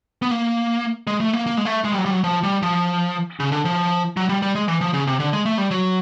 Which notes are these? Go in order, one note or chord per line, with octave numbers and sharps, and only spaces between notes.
B3
A#3
G#3
A3
A#3
A#3
G#3
A3
G#3
G3
F#3
G3
F#3
F3
G3
F3
C#3
D3
F3
F#3
G3
G3
G#3
E3
F3
C#3
C3
D3
G#3
A3
G3
F#3